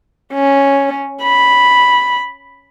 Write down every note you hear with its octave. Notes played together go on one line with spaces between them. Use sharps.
C#4
B5